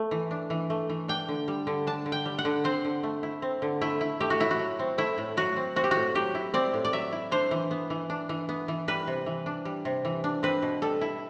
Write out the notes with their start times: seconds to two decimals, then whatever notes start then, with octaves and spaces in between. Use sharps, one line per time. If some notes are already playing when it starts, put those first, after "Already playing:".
Already playing: A3
0.11 E3
0.31 D4
0.50 E3
0.70 A3
0.90 E3
1.08 D4 G5
1.28 D3
1.48 G3
1.67 D3
1.87 D4 A5
2.06 D3
2.12 G5
2.26 G3
2.39 F#5
2.45 D3
2.64 C4 C5
2.84 D3
3.03 A3
3.23 E4
3.42 C4
3.62 D3
3.81 A3 E4
4.01 E4
4.20 A3 G4
4.30 F#4
4.40 A2 E4
4.51 F#4
4.59 F#3
4.79 C4
4.98 A3 E4
5.18 A2
5.37 F#3 F#4
5.56 C4
5.76 C4 F#4
5.84 G4
5.91 A2 F#4
6.15 F#3 G4
6.35 E4
6.54 C4 D5
6.73 A2
6.85 D5
6.93 F#3 E5
7.12 E4
7.31 D4 C5
7.51 E3
7.71 B3
7.90 E3
8.10 D4
8.29 E3
8.49 B3
8.68 E3
8.88 G3 B4
9.07 C3
9.26 E3
9.46 D4
9.65 G3
9.85 C3
10.05 E3
10.24 D4
10.43 C4 B4
10.62 B2
10.82 G3 A4
11.01 E4